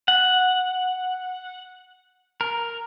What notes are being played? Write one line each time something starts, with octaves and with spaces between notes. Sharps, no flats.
F#5
A#4